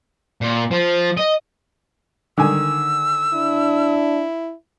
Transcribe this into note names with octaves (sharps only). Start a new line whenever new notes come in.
A#2
F3
D#5
D3 D#3 G#5 E6
D4 E4